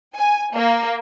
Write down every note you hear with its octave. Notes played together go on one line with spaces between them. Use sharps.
G#5
A#3